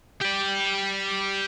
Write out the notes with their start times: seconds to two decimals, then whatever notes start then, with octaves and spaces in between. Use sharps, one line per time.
0.21 G4 D5